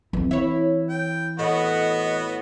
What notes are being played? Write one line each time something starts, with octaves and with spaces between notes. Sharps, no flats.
E3 C4
E4 C#5
G5
A2 B3 F#4 D#5